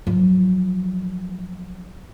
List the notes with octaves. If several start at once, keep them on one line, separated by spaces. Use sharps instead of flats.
F3 F#3